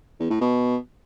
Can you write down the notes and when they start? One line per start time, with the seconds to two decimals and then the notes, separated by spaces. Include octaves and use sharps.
0.20 E2
0.30 A2
0.41 B2